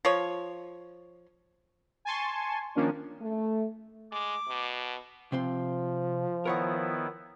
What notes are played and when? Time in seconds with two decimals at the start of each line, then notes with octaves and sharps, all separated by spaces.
0.05 F3 F4 C#5
2.05 G#5 A5 C6 C#6
2.75 D#3 F3 A#3 C#4 D4
3.22 A3
4.12 G#3 D6
4.49 B2
5.32 C3 F3 C4 C6
6.45 D#3 B3 E4 A#4 C#5 F#5